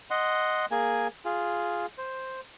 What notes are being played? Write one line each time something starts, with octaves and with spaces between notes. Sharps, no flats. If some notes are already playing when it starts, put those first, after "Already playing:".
D#5 F#5 C6
A#3 G#4 G#5
F4 G#4
C5